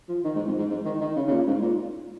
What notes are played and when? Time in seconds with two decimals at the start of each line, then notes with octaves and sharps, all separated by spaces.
0.09 F3
0.24 D#3
0.35 G#2
0.47 F2
0.58 G#2
0.70 G#2
0.85 D#3
1.01 D#3
1.16 C#3
1.28 C#3
1.31 A#2
1.47 G#2
1.62 A#2